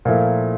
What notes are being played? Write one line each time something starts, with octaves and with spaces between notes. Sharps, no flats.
A#2 F3 A3 E4 A#4